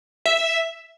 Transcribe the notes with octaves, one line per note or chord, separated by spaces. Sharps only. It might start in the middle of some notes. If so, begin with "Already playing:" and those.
E5